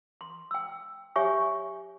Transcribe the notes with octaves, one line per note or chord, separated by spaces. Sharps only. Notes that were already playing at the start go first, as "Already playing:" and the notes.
C6
G5 E6
G4 C#5 E5 G#5 C#6